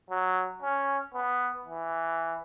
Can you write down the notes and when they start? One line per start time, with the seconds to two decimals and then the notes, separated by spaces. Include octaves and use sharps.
0.10 F#3
0.62 C#4
1.14 B3
1.65 E3